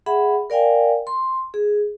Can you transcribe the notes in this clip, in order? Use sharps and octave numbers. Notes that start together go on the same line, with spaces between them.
G#4 E5 F#5 B5
A#4 D5 F5 G5 G#5
C6
G#4